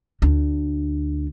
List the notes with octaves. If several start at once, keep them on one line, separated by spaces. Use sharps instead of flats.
D2 D4